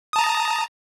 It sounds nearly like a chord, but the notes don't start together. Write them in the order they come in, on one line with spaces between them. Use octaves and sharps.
D#6 A5 A#5